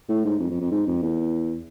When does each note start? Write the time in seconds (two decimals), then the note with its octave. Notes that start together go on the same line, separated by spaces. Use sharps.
0.09 A2
0.25 G#2
0.39 F2
0.50 F2
0.61 F2
0.71 G#2
0.87 F2
1.02 E2